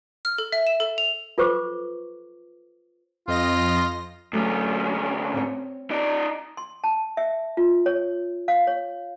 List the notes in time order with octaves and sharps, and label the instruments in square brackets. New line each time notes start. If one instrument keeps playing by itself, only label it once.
[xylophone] F6
A4
E5
E7
A4
F7
[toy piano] F4 A4 B4 C5 C#6 D6
[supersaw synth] F2 D#5 A#6 [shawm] F4
[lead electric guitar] D2 C#4 [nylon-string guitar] F#3 A3
[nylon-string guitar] C4 C#5
[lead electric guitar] D#4 D5
[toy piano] C6
A5
E5
F4
C#5
F5
C#5